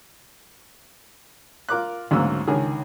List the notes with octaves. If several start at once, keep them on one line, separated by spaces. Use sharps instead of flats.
F4 A#4 D6 F#6
D2 G#2 C#3 F#3 A#3 E6
C#2 D3 D#3 G#4